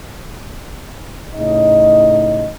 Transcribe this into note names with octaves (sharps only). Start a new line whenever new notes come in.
A2 C#3 D#4 D#5